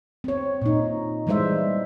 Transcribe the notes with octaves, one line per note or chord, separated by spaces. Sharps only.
C4 C#5
A#2 D#4
E3 G3 G#3 C5 E5